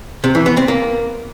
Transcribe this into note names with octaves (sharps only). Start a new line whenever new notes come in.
C3
E3
B3
C4
A#3